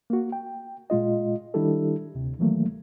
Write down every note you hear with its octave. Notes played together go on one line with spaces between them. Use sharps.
A#3 F#4
G5
A#2 G#3 F4 D#5
D#3 G3 D4 E4 G4 A4
D2 C3
D#3 E3 F#3 A3 A#3